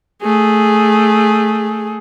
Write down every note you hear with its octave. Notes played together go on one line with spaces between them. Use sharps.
A3 G#4